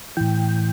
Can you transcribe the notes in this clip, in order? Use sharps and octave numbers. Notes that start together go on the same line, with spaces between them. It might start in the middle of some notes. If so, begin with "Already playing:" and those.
A2 E3 G5